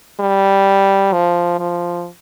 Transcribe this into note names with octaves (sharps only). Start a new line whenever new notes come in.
G3
F3
F3